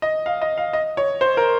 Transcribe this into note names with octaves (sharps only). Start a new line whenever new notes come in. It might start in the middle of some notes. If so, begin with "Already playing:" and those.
D#5
F5
D#5
F5
D#5
C#5
C5
A#4